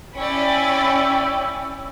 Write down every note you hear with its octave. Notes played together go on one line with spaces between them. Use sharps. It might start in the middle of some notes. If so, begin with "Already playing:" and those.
C#4 E4 D5 G5 B5 C#6 E6